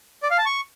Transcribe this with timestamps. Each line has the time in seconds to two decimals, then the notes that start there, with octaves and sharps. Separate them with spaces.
0.23 D5
0.31 F5
0.38 A5
0.46 C#6